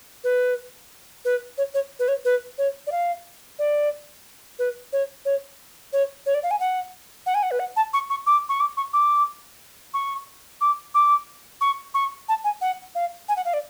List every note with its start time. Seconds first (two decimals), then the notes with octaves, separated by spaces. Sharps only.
0.24 B4
1.25 B4
1.58 C#5
1.74 C#5
1.99 B4
2.08 C#5
2.25 B4
2.58 C#5
2.87 D5
2.92 F5
3.59 D5
4.59 B4
4.93 C#5
5.25 C#5
5.93 C#5
6.26 C#5
6.34 D5
6.43 F5
6.51 G#5
6.60 F#5
7.26 F#5
7.35 G#5
7.43 F#5
7.51 B4
7.60 F#5
7.76 A5
7.93 C#6
8.10 C#6
8.26 D6
8.49 C#6
8.60 D6
8.77 C#6
8.93 D6
9.94 C#6
10.61 D6
10.94 D6
11.61 C#6
11.94 C#6
12.29 A5
12.44 G#5
12.61 F#5
12.95 F5
13.29 G#5
13.37 F#5
13.45 F5
13.54 D5